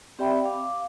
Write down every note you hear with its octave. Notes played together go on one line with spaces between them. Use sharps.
C4 G4 D5 E5 G5 B5
F5 D6